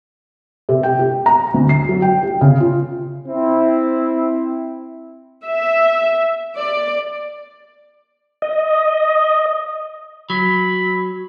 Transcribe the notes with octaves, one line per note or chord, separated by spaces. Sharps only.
C3
G5
G4
A#5
D2
C7
F#3
G5
G4
C#3
F4
C4 E4
E5
D5
D#5
F#3 B5